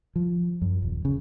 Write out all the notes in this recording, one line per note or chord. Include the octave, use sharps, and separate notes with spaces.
F3
F#2
D#1
C#3